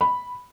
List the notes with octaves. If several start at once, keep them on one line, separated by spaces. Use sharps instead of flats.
B5